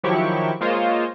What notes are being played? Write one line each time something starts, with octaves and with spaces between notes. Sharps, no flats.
D#3 F3 F#3 E4 G4 C#6
G#3 A#3 F4 C5 C#5 D#5